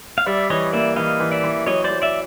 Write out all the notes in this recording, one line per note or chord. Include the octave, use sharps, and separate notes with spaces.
F5
G3 D5 E5
E3 C#5 D#5
A#3 D5 E5
E3 D#5 F5
E3
D5 E5
E3
F#3 C#5 D#5
C5 D5
F#3
D5 E5